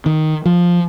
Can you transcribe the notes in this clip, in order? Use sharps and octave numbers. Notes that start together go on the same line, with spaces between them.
D#3
F3